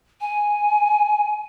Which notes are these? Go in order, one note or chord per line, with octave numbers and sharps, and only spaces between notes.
G#5